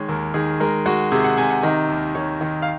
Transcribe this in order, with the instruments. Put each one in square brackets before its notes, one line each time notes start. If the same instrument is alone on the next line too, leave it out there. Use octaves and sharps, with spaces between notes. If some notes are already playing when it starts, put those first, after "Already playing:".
Already playing: [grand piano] D#3 G#3 C#5
D#2 A#4
D#3 G#4
G#3 A#4
G#3 F#4
C3 G#4
F#5
C3 G#5
F#5
D#3 D#5
D#2
D#3 C#5
D#3
F5